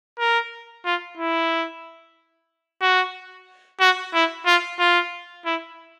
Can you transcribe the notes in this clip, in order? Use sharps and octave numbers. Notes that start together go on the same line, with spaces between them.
A#4
F4
E4
F#4
F#4
E4
F4
F4
E4